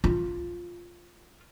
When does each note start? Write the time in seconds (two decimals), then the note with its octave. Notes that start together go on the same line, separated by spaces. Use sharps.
0.04 F4